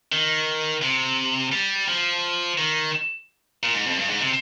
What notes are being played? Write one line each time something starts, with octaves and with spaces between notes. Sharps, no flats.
D#3
C3
G3
F3
D#3
A#2
G#2
F2
G2
G#2
C3